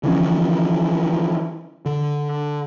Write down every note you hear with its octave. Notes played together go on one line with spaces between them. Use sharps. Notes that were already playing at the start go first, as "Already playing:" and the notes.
D3 E3 F3 C#4
D3